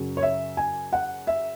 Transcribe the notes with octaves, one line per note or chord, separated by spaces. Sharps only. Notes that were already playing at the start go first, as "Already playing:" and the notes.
Already playing: F#2 C#3 F#3
C#5
E5
G#5
F#5
E5